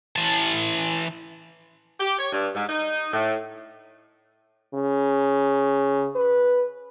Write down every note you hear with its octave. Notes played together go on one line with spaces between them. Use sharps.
E3 A5
G4
C#5
G2
G#2
D#4
A2
C#3
B4